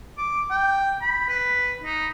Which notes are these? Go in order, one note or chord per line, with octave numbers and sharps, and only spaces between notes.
D6
G5
B5
B4
D#4